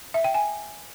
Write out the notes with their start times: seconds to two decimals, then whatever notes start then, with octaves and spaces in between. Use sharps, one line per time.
0.14 E5
0.24 G5
0.34 G#5